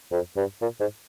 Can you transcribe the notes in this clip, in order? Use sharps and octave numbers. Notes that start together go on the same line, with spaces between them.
F2
G2
A#2
G#2